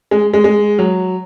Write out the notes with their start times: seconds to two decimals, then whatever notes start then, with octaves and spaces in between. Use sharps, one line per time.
0.11 G#3
0.34 G#3
0.44 G#3
0.79 F#3